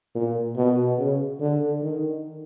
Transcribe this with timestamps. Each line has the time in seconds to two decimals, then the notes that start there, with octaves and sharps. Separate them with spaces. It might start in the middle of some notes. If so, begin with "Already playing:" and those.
0.15 A#2
0.57 B2
0.98 C#3
1.40 D3
1.82 D#3